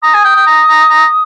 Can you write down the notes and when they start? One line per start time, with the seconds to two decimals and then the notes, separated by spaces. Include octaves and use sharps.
0.03 A#5 D#6
0.14 G#5
0.25 G5
0.36 G5
0.47 A#5
0.68 A#5
0.90 A#5